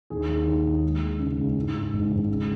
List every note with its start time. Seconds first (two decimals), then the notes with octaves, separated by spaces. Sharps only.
0.10 D#2 G#4
0.29 D#2
0.47 D#3
0.65 D#2
0.84 G#3
1.01 G#3
1.19 C#3
1.38 C#2
1.57 G#2
1.74 G#2
1.93 G#1
2.11 G#1
2.29 C#2